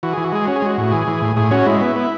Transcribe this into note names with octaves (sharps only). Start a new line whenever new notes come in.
E3 F#4
E3 G#4
F#4
G#3 G#4
C#4 F#4
G#4
G#3 F#4
A2
E3 G#4
E3
A2
A2 G#4
C#4 F#4
G#3 E4
B3
B3